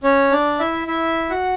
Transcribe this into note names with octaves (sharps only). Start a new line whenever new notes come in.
C#4 C#5
D4 D5
E4 E5
E4 E5
F#4 F#5